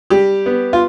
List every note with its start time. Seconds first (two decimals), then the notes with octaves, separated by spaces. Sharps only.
0.10 G3 G4
0.46 B3
0.73 F4